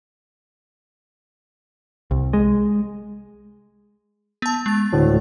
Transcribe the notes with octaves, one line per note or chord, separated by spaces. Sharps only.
C2
G#3
B3 A5
G#3 A6
D2 A2